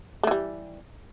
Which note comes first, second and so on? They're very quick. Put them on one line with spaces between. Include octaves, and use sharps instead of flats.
A3 E3 G3